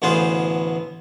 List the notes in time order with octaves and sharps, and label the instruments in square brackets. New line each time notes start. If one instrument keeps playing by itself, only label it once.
[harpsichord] A1 D2 B3 G#4 C5 F5